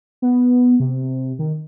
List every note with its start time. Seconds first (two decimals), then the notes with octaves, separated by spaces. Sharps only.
0.22 B3
0.80 C3
1.39 D#3